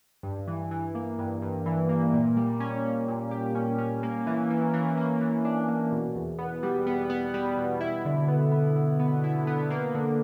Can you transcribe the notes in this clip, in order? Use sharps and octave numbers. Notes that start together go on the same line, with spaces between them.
G2
E3
E3
A#3
G2
G2
E3
A#3
A#2
G3
C#4
C#4
A#2
G4
C#4
C#4
A#3
E3
E3
E3
A#3
E3
D4
A#3
B2
E2
B3
G3
B3
B3
G3
B2
E4
D3
B3
B3
E4
B3
E4
B3
A#3
D3